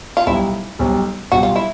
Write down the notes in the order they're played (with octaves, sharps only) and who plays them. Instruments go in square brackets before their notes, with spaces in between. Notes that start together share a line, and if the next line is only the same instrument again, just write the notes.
[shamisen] F4
[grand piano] B1 B2 G3 [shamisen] E4
[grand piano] B1 B2 G3
[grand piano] B1 B2 G3 [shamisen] F#4
[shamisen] F4
E4